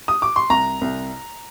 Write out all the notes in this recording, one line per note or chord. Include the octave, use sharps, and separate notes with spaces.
D#6
D6
C6
C2 A#5
C2